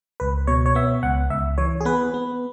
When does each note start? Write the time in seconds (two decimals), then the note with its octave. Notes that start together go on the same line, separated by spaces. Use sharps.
0.20 C#2 B4
0.47 B2 C#5
0.66 C#5
0.75 B3 E5
1.03 C#2 F#5
1.30 C#2 E5
1.58 E3 C#5
1.81 G#4
1.85 B3 B4
2.14 B3